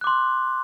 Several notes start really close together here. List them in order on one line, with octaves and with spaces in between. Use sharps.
F#6 D6 C6